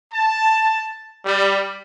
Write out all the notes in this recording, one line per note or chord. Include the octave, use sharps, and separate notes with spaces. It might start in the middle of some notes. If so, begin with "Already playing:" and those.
A5
G3